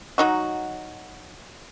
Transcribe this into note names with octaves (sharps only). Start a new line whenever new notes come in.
F#3 D#4 F#4